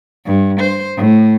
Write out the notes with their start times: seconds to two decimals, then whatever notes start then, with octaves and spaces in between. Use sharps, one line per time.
0.24 G2
0.58 C5
0.96 A2